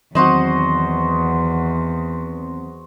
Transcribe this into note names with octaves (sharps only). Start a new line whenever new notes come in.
E2 D#3 F#3 C4 F#4 C5 D#5